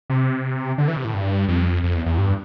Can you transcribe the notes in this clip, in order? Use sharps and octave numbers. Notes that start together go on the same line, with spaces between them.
C3
D3
E3
C3
A2
G2
F2
F2
E2
E2
G2